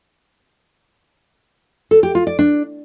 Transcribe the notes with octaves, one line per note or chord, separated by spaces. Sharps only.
A4
G4
F4
D5
D4